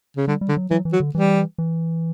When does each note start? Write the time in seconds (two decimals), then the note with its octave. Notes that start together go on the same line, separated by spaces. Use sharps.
0.17 C#3
0.27 D3 G3
0.41 G3
0.49 D3
0.57 F#3
0.70 E3 F#3
0.85 E3
0.93 F#3
1.00 D3
1.15 E3 G3
1.58 E3